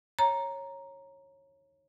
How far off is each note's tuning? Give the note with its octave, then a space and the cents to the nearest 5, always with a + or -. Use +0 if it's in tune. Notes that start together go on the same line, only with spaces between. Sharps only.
C#5 -15 A#5 +0